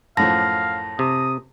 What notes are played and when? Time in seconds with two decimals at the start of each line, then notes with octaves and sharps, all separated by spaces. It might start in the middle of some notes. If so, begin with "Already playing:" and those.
0.17 F#2 A2 F3 F5 A5 A#6
0.99 C3 D#6